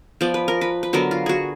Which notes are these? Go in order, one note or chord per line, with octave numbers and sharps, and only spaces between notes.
F3 B3 D5
B4
A#4
B4
B4
D3 F#3 B3 A#4
F4
F#4 G#4